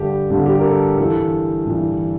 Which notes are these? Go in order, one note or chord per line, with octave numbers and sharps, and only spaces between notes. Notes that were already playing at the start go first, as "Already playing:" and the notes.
Already playing: G2 D3 G4
G2 D3 G4
G4
A#4
A4
G2 E3 A4
G2 E3